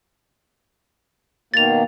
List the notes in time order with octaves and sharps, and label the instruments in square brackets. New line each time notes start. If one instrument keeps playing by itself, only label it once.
[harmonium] B2 D#3 A#3 [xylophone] A6 F7